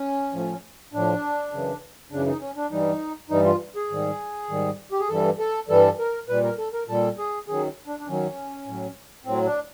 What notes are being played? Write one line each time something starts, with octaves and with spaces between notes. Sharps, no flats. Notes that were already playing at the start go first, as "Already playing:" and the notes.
Already playing: C#4
A2 F3
A2 F3 D4
F#2 C#3 E3
F#2 C#3 E3 D4
D#4
C#4
D4
G2 E3 G3 D#4
G2 E3 G3 D#4
F4
G#4
G#2 D#3 G3
G#2 D#3 G3
G4
G#4
G2 E3 G3 A4
A4
G2 E3 G3 A4
A#4
A#2 G3 B4
A#4
A4
A#4
A#2 G3 A4
G#4
F#2 D#3 F#3 G#4
D4
D4
F#2 D#3 F#3 C#4
A2 F#3
A2 F#3 C4
D4